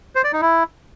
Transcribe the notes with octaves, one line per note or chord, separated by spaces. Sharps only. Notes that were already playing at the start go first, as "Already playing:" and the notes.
C5
D5
D#4
E4